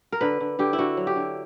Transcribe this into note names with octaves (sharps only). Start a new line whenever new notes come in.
A#4
D3 B4
D3
D3 G4
E4
D3 F#4
F#3
G4
D3